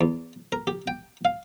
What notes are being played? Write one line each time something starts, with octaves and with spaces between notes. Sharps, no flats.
E2
A#4
G4
G5
F5